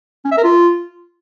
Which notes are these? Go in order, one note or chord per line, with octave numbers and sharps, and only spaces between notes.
C#4
E5
A#4
F4